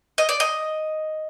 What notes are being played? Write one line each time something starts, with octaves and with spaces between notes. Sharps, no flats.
D#5
D5
D#5